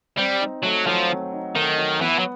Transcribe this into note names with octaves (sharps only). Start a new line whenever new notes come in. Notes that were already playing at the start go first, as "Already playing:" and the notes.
G3 C4
D#4
F#3 A3
F3 F#3
C4
D#4
D#3 A3
F#3
E3 B3
F#3